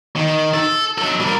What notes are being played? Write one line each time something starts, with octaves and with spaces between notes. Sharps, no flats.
D#3
A4
F#3 A4
G3 A#4